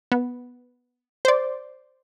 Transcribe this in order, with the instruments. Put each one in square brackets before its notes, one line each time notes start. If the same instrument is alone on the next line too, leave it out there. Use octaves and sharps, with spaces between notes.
[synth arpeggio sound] B3
C5 D5